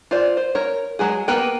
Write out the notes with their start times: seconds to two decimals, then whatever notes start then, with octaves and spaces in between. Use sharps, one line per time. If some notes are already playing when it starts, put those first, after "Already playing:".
0.11 F4 C5 D5
0.37 C5
0.55 A#4 C#5
0.99 F#3 G#3 G#4
1.28 A#3 B3 A#4 B4 G5